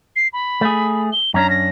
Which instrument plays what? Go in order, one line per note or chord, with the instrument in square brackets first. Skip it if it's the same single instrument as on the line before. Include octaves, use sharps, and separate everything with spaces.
[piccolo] C7
B5
[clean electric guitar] A3 G#4
[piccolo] G7
[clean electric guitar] F#2 C#4 D4 [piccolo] A#5
[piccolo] A#6